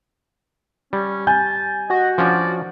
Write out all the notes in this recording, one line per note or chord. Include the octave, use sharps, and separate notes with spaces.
G3 C#4
G#5 A5 G6
F#4 D#5
F3 C#4 D4 D5